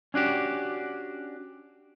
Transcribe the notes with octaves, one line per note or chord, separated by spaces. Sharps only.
C#4 D4 F#4 G4